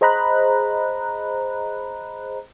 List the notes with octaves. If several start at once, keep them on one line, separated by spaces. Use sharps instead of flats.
G#4 C5 D#5 A#5 B5 F#6